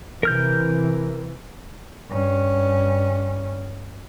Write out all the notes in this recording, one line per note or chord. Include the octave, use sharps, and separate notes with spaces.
C3 E3 A#4 F6 G6
G2 C#4